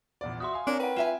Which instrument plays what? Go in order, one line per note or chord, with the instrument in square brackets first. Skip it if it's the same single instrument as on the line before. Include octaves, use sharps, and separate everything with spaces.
[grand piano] A#1 E2 D5
[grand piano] F#4 E5 [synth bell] C6 D#6
[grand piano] F5 G#5
[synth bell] C4 [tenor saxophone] D4 [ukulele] A#4 C#5
[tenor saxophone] B4 [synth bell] F#5 G5
[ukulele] F4 E5 G#5 [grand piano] E7